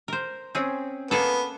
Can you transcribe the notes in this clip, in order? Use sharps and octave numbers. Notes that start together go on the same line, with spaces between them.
A#4 C5
C4 C#4 G#4
A#3 B3 G#4 A4